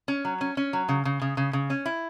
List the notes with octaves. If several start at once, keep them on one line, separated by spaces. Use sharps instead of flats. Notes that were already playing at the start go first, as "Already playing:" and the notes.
C#4
F#3
C#4
C#4
F#3
C#3
C#3
C#3
C#3
C#3
C#4
E4